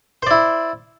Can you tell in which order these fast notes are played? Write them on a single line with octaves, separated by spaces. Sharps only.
C5 D5 E4